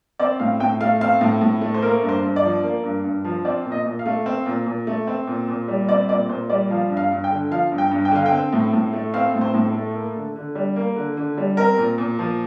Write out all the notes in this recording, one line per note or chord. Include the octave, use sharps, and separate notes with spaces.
C4 D5
A2 F5
A2 G5
A3 F5
C4 F5
A2
A2
A3
C5
A#3 A#4
G2
C5
G2
D5
F3
A#3
G2
G2
F3
C4 D5
A#2
D#5
A#2
F5
A3
C4
A#2
A#2
A3
C4
A#2
A#2
G3
C4 D5
A#2 D5
A#2 C5
G3 D5
F3 F5
G2
F5
G2
G5
D3
F3 F5
G2
G5
G2
G5
D3 F5
G5
C4
A2
A2
A3
C4 F5
A2
C5
A2
A4
A3
A#3
D3
D3
G3
A#3
D3
D3
G3
C4 A#4
A#2
A#2
F3